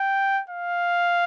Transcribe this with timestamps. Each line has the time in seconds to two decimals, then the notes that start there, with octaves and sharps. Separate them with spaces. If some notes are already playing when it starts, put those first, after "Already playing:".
Already playing: G5
0.49 F5